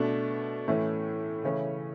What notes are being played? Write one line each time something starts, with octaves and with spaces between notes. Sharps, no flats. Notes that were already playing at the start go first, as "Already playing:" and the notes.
Already playing: B2 A3 D4
A2 E3 A3 C#4
C#3 E3 A3 C#4